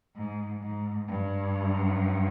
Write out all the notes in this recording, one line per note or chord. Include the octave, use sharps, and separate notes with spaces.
G#2
G#2
G2